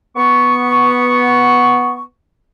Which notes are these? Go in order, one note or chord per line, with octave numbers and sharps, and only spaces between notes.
B3 C#6